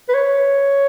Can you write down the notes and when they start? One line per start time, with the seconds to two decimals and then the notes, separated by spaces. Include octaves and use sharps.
0.09 B4
0.14 C#5